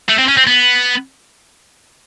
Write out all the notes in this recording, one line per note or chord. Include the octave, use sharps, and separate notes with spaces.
A3
C4
C#4
C4
B3